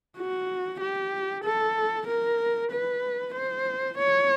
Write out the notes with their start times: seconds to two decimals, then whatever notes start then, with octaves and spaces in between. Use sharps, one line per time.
0.18 F#4
0.81 G4
1.44 A4
2.07 A#4
2.72 B4
3.35 C5
3.98 C#5